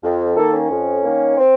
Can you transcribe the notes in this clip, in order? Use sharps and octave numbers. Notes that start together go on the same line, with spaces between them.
F2
D#3 A#3 A4
C#4
F2
D#3 A#3
C4